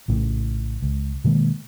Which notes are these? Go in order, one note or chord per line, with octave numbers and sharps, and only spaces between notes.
A#1 A2 C#3
C#2
B2 D#3 G#3 A#3